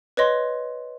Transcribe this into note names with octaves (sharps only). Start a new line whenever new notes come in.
B4 C#5 D#5 C6